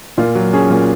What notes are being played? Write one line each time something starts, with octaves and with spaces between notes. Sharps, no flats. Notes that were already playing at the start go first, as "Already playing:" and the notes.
A#2 F4
F#3
C#4 G#4
A#2